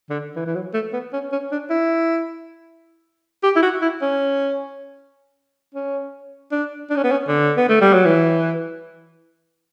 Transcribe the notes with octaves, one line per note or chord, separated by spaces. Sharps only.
D3
E3
E3
F#3
A3
B3
C#4
C#4
D4
E4
G4
E4
F#4
E4
C#4
C#4
D4
D4
C#4
B3
C#4
D3
B3
A3
G3
F#3
E3